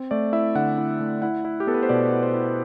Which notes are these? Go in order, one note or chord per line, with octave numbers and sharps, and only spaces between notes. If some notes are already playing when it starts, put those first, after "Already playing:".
Already playing: C4
A3 D5
E4 E5
D3 F#5
E4
A3
E4 F#5
E4
G4
B3 A4
B4
C5
B2 D5
E4
C5
E4